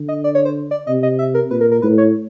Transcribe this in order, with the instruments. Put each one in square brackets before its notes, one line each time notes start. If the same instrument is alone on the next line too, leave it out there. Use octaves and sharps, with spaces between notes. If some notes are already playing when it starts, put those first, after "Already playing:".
Already playing: [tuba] D3
[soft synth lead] D#5
D5
C#5
C5
D5
[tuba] C3 [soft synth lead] D#5
[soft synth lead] D#5
E5
A#4
[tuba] A#2 [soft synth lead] B4
[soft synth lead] A#4
A#4
[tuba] A2 [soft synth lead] B4
[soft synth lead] C#5